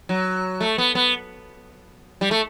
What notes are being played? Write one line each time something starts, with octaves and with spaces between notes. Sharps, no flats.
F#3
A3
B3
B3
G3
A3